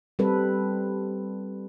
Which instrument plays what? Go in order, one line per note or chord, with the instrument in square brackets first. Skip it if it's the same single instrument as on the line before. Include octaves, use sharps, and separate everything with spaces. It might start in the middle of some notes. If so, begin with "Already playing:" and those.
[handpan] G3 C4 A4 B4